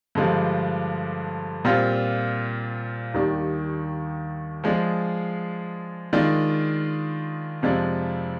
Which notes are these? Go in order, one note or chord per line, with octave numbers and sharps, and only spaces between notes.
G2 D3 F3 G#3
A#2 G3 C4 F4
D#2 D#3 G3 D4
F3 G#3 D4 G#4
D#3 G#3 D4 F4
F2 C3 F3 G#3 D4